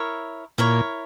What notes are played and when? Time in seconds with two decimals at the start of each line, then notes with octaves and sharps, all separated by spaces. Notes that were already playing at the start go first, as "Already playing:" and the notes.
Already playing: E4 A#4 C#5
0.58 A#2 E4 A#4 C#5